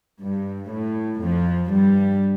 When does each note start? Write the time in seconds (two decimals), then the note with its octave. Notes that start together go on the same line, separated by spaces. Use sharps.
0.21 G2
0.72 A2
1.22 F2 F3
1.73 G2 G3